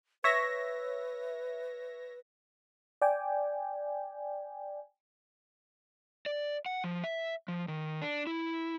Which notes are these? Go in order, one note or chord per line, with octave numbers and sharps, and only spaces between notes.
B4 C#5 E5 A#6
D5 G5 G#5
D5
F#5
F3
E5
F3
D#3
D4
E4